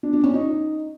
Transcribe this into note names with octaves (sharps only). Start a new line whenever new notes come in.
D4
D4
C#4
D#4